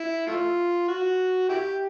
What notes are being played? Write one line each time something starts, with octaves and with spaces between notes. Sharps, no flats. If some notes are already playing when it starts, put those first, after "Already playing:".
Already playing: E4
A3 F4
F#4
E4 G4